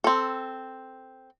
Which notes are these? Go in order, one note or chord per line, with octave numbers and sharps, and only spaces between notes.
C4 A4